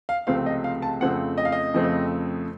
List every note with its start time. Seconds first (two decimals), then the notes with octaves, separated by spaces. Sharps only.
0.09 F5
0.27 C#2 C3 F3 A3 C4 F5
0.46 D#5
0.64 F5
0.82 A5
1.01 F2 C#3 F3 A3 C4 F#5
1.38 D#5
1.45 F5
1.52 D#5
1.74 F2 C#3 F3 A3 C4